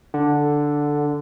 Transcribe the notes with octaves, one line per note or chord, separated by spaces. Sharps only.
D3